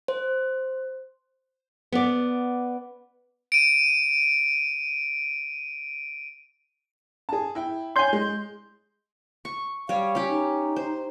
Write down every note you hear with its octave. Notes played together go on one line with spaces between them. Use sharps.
C5
B3 D5
D7 D#7
G#4 A5
E4 G5
C#5 G#5 C6 G6
G#3
C#6
G3 C#5 F5
C#4 G4
D#4
C5